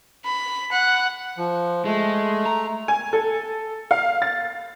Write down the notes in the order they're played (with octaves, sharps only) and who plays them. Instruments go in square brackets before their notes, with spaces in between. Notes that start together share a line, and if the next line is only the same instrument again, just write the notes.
[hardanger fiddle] B5
F#5
[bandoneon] F3
[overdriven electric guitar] G#3 [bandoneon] A3
[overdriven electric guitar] A#5
[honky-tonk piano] G#5
A4
F5
A6